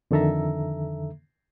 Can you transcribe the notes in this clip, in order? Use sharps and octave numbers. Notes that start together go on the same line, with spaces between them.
F2 D3 D#3 A4 E5 A#5